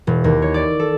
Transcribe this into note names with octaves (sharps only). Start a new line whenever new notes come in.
E1
D#2
C#5
D5
A4